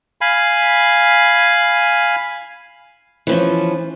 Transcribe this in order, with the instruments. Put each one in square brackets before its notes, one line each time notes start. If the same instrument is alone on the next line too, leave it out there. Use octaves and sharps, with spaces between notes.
[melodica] F5 G#5 B5
[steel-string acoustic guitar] E3 F3 C#4